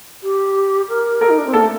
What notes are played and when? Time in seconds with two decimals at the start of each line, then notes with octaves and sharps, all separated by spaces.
0.23 G4
0.89 A#4
1.21 A4 A#4
1.29 D#4
1.38 D4
1.46 C4
1.53 A#3 A4
1.62 A3